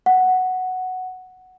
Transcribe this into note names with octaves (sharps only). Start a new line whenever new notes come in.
F#5